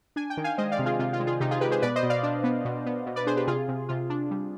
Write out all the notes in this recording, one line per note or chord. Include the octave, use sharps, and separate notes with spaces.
D4 G#5
G5
D#3
F5 G#5
G#3 C5 D#5
D5 F5
C3
F4 G#4
C3 F4
F4
G#3
F4 G#4
C3 D#4 G4
F4 G#4
G#3 G4 B4
G#4 C5
B2 B4 D5
C5 D#5
B2
D5 F5
D4
B3
B2
B3
B2
B4 D5
D4 G#4 C5
G4 B4
C3 F4 G#4
C3
C3 F4
D4
G3